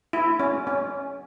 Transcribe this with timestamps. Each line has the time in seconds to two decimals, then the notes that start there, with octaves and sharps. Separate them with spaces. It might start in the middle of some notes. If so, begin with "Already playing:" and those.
0.13 E4
0.40 C#4
0.67 C#4